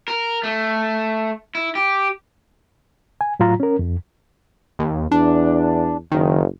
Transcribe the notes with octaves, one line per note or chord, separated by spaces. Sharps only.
A#4
A3
E4
G4
G#5
A2 F#3 F4 A#5
C#4 A#4
F2
D#2
E2 D4
F#1 D#3